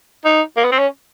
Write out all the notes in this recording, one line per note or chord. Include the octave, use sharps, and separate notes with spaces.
D#4
A#3
B3
C4
C#4